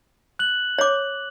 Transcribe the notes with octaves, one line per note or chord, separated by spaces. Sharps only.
F#6 F#7
C#5 D6